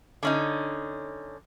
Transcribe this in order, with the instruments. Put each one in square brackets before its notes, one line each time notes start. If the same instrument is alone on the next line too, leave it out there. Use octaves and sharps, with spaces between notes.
[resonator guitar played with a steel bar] D3 C#4 D#4